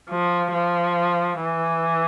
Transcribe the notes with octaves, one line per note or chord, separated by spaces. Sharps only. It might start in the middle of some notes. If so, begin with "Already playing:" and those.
F3
F3
E3